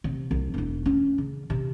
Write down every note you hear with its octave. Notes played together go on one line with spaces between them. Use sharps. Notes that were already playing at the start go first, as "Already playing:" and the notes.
C3
C2
E1 E4
C#4
C#3
C3